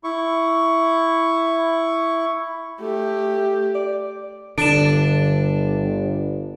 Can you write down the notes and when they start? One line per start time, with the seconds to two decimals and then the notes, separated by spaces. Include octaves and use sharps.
0.04 E4 C#6
2.81 A3 G4
3.75 D5
4.58 G1 D3 D4 D7 E7